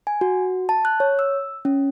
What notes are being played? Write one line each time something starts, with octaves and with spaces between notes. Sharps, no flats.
G#5
F#4
A5
F#6
C#5
E6
C#4